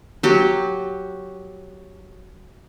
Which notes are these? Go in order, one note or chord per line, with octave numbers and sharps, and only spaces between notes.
F#3 G4